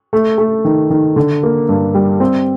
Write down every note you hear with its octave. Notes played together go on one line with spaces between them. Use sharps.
A3
A3
D#3
D#3
D3
A#3
G2
G3
C4